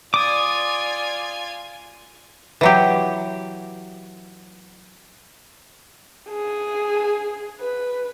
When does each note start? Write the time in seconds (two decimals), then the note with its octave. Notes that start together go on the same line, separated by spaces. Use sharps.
0.14 F4 D5 G#5 D6 D#6
2.61 E3 F#3 G4
6.29 G#4
7.61 B4